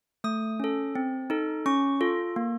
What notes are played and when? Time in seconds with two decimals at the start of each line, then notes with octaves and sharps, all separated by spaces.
0.24 A3 D#6
0.60 C#4 A4
0.95 C4
1.30 D#4 A4
1.66 C#4 C#6
2.01 F4 A4
2.36 A#3